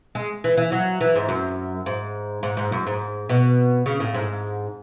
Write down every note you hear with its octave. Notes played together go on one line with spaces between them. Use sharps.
G#3
E3
E3
F#3
E3
G#2
F#2
G#2
G#2
G#2
F#2
G#2
B2
C#3
A2
G#2